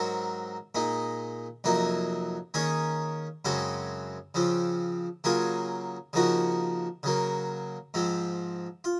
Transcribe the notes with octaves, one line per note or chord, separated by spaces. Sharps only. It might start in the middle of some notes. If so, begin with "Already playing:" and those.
Already playing: G#2 F#3 C4 F#4 A#4
A#2 G#3 D#4
F2 C3 F#3 A#3 D#4
D#3 A#3 C#4 G#4 C#5
F#2 C#3 G#3 C4 F#4
C#3 F3 C4
C#3 F#3 A#3 F4 G#4
C#3 F3 A#3 D#4 F#4
C#3 F#3 A#3
G#2 F3 C4
F4